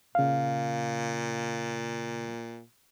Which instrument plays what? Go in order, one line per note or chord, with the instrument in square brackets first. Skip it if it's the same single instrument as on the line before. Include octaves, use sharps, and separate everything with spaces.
[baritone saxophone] A#2 [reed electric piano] C#3 F5